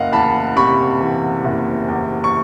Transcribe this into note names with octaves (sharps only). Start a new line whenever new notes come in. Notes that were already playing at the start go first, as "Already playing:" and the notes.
Already playing: F#1 D#5 F5 F#5
E2 A5 B5
C3 B5 C#6
E3
F#1
E2
C#6